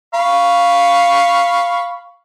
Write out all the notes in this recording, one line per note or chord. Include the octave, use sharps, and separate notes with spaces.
F5 B5 C#6